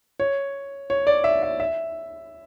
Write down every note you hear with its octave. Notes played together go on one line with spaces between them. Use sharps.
C#5
C#5
D5
E5
E5
E5